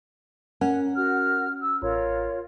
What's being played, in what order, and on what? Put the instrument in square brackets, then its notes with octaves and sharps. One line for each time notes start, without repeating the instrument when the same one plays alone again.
[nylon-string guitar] C#4 [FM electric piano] A#4 F#5
[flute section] F#4 F6
E6
[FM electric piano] A1 [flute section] F4 A#4 C#5